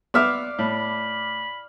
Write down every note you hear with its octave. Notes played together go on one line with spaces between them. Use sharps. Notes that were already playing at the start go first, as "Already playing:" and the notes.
B3 D5 E5 F5 D6
A2 B5